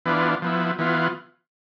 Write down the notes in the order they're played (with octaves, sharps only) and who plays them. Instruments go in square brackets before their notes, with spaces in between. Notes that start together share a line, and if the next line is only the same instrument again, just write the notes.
[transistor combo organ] E3 B3 D4 F4
F3 B3 E4
E3 B3 F4